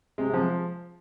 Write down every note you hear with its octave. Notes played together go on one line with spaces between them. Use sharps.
C3 G#3
C3
F3